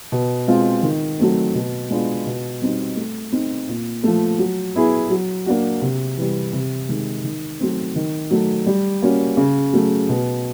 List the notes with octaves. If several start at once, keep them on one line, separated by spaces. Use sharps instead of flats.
B2
G#3 C4 F4
D#3
F#3 A3 C4
B2
G#3 B3 D4 F4
B2
G3 C4 D#4
A3
C4 D#4
A#2
F3 A3
F#3
B3 E4 G#4
F#3
A#3 D4 F#4
C3
E3 G3
C3
D#3 G#3
D#3
F#3 A3 C4
D#3
F#3 A3
G3
A#3 C#4 F#4
C#3
F#3 A3
B2